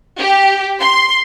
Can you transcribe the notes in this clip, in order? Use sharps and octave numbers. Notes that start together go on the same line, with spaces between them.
G4
C6